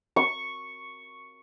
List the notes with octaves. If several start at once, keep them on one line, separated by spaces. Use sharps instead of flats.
C#6